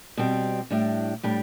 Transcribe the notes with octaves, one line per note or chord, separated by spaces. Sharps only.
B2 G3 C4
A2 G3 D4
A2 G3 D4